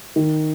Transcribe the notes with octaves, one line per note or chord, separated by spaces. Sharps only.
D#3